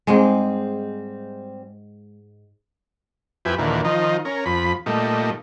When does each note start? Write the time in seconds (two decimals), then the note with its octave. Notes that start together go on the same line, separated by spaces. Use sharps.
0.07 G#2 G3 G#3 C4 G#4
3.45 F2 E4 G4 B4 G#5
3.59 D#2 A#2 D3 E3
3.84 D#3 F3 D#4
4.25 C#4 A#4
4.46 F2 B5
4.86 A#2 G3 A3 D#4